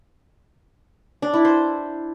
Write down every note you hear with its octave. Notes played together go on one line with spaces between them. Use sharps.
D4
E4
C5